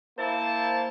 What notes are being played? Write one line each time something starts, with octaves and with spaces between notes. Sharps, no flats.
A#3 E4 C5 A5